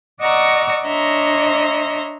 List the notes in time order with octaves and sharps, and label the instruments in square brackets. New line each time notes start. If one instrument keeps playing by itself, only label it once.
[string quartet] D5 D#5 F#5 A#5 C#6 E6
D4 C#5 D#5 E5 A#5 C6